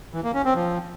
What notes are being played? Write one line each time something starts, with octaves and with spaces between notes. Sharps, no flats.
E3
A#3
C#4
C4
F3